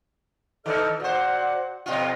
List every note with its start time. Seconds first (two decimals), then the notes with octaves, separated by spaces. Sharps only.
0.66 D#3 D#4 A4 D#5 F6
1.00 A#2 F#4 C5 F#5
1.86 F2 B2 F4 D#5 G5